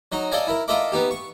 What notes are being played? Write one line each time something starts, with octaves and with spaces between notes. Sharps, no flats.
F#3 D#4 D#5
A4 D5 D#5 F5 G#5 A#5
E4 A#4
F4 A4 A#4 D#5 E5 D6
B3 D#4 G4
C#6